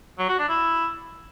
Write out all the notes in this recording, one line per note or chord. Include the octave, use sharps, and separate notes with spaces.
F#3
F#4
D4
E4